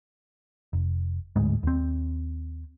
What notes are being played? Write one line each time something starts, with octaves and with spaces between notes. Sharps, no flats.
F1
D1 D2 G#2 G#3
D#2 C4